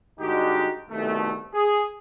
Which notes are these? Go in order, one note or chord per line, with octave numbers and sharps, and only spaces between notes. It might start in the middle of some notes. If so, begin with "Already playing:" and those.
G2 D3 G#3 D#4 F#4 G4
C2 B2 D#3 A3
G#4